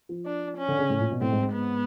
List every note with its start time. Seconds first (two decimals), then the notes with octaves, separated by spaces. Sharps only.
0.09 F3
0.26 D4
0.58 C#4
0.68 D3
0.79 C#3
0.89 A2
1.00 A#2
1.11 B2
1.21 A2 C4
1.32 G#2
1.42 G#2
1.53 B3